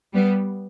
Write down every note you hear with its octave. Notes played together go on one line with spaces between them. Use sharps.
G3 B3